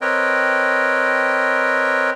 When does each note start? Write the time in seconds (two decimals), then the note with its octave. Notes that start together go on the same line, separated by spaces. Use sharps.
0.01 C4 A#4 B4 C#5 D#5 G5